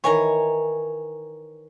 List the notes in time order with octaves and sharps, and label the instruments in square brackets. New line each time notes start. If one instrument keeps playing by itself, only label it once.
[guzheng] D#3 E3 [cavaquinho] C#5 G#5 A#5